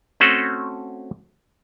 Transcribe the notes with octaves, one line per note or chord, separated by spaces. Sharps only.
A3 C4 C#4 F#4 A4